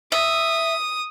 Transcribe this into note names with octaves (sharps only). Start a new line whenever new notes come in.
E5 D#6